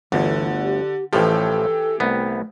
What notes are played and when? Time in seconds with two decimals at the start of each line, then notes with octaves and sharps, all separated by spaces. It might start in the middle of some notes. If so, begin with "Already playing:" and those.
0.12 G1 D2 D3 E3
0.63 G4
1.13 A1 A2 E3 F3 G4 A4
2.00 C2 A3 B3